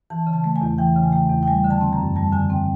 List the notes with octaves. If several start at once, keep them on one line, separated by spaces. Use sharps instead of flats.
E3 A5
C#3
A5
A3
G#5
E2
E3 G5
C#3
G#5
A3 G5
E2
G5
G3 G#5
D3
A5
C4
A#5
F#2
G3 A5
D3 G#5
C4 G5